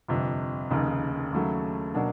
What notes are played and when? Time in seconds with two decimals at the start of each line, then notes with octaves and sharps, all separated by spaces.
0.08 G1 F2 C3
0.70 F1 D#2 C#3
1.32 D#2 C#3 F#3 A3
1.94 B2 F#3 A#3 D4